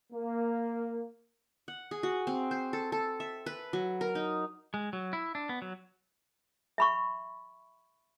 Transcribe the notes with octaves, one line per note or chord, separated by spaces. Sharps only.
A#3
F#5
G#4
F#4
C4
C5
A4
A4
E5
B4
F#3
A#4
D#4
G#3
F#3
E4
D4
B3
F#3
E5 B5 C#6